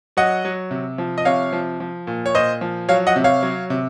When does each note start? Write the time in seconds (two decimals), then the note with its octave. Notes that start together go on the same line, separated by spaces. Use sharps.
0.17 F#3 D#5 F#5
0.45 F#3
0.71 C3
0.98 F3
1.18 D#5
1.25 C3 C#5 F5
1.52 F3
1.80 F3
2.07 A#2
2.26 C#5
2.35 A#2 C5 D#5
2.61 F3
2.89 F#3 C#5 F5
3.07 D#5 F#5
3.16 C3
3.24 C#5 F5
3.43 F#3
3.70 C3